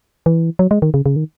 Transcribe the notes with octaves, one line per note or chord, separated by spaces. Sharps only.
E3
F#3
G#3
D#3
C#3
C#3
D#3